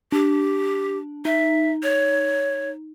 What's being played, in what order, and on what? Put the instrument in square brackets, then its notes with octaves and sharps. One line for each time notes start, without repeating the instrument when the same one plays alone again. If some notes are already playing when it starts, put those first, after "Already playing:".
[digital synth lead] D4 [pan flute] G4
[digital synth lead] D#4 [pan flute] E5
[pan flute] C#5